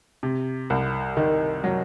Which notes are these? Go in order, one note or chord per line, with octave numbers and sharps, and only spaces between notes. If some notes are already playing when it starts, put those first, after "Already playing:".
C3
C2
D#3
F#3